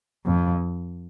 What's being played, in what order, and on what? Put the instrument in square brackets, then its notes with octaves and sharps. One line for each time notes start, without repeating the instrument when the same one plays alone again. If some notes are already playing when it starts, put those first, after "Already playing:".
[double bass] F2